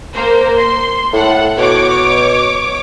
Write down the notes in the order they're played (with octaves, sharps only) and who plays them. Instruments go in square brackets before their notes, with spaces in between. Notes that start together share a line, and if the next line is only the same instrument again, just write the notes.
[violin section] A#3 A#4 C5
C6
[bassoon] A2 [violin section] A4 F#5
[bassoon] B2 [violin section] C#5 D6